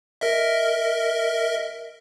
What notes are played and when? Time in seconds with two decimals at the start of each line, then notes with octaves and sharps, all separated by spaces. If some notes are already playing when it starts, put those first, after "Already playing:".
0.21 A#4 D#5 E5